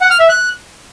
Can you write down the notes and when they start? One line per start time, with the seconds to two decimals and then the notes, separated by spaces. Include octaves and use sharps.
0.01 F#5
0.10 F6
0.20 E5
0.29 F#6